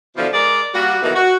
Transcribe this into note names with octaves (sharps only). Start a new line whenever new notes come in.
B2 D3 E3 F3
G#3 G#4 A#4 D5
G3 A#3 F#4
B2 D#3 E3 F#3 A3 F#4
F#4